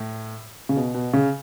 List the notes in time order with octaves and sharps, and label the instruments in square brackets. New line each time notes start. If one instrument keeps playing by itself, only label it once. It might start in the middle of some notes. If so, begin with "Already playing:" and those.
Already playing: [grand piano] A2
C#3
B2
B2
C#3